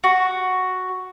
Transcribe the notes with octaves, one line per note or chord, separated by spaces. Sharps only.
F#4